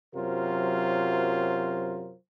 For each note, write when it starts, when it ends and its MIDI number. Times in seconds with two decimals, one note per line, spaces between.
0.15 2.14 42
0.15 2.14 48
0.15 2.14 54
0.15 2.14 65
0.15 2.14 70
0.15 2.14 72